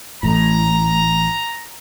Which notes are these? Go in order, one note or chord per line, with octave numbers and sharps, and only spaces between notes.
A1 A2 A#5